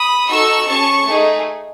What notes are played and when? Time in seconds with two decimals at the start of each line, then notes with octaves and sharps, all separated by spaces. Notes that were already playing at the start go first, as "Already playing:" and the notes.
Already playing: B5 D#6
0.28 D#4 F#4 A4 C#6 E6
0.67 C#4 G#4 A5 C#6
1.07 A3 D#4 G#4